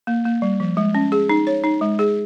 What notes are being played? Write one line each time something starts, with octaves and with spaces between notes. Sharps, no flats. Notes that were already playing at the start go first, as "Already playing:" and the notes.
A#3
A#3
G3
F3
G#3
C#4
G#4
D#4
C#5
D#4
G#3
G#4